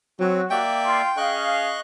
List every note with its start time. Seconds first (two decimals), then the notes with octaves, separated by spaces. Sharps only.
0.20 F#3 C4 F#4
0.51 A#3 D5 E5 G5
0.85 F4 C6
1.17 C#4 G#4 D#5 F5 C#6 F#6